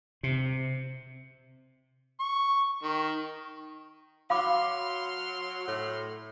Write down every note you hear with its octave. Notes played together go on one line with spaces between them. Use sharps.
C3
C#6
D#3
F#3 F5 B5 C6 D6 F6
A2